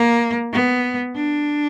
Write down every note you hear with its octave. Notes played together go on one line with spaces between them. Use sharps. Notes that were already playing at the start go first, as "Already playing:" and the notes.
Already playing: A#3
B3
D4